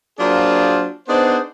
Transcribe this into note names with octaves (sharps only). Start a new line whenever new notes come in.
F#3 A#3 D4 F4 G#4 C5
B3 D4 D#4 G#4 C5